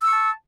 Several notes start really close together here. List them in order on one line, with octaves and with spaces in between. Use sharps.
E6 C#6 A5